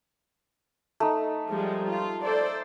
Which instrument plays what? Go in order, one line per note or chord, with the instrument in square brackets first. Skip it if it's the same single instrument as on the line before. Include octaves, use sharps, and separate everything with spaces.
[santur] A3 D#4
[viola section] F3 G3 G#3
F4
A4 C5 D5